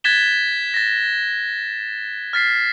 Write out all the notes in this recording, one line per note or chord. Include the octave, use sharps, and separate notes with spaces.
F#6 G#6 A6 B6 E7 G7
A6 A#6
F6 A6 B6 C7